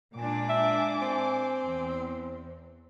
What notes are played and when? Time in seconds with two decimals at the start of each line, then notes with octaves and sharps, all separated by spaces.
0.15 A#2 G#3 D4 G#5 D6
0.49 E5
1.02 C4
1.63 E2